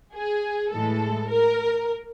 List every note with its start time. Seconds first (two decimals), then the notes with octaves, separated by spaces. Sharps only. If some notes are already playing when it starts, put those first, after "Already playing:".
0.15 G#4
0.72 A2 E3 G#3 A4
1.28 A#4